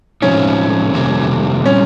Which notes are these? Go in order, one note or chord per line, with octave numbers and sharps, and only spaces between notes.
A2 F3 G#3 C4 C#4 D#4
F2 C3 D#3 G3 A#3
A#2 G3 C4 C#4